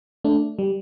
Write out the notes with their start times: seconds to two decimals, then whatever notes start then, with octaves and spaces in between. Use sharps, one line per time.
0.24 A3 D4
0.59 G3